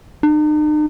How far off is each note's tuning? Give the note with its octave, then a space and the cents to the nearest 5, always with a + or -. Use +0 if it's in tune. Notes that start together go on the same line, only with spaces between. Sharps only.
D#4 -45